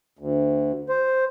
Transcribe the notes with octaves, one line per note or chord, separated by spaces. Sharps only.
D2
C5